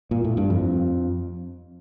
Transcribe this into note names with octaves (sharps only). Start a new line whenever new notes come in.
A#2
A2
G2
F2